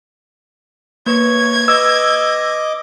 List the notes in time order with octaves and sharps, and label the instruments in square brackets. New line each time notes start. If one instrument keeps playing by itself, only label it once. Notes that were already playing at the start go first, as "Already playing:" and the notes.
[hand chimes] A#3 B4 [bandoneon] C#5 [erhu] G#6
[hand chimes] B4 [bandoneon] D#5 D6 [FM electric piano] E6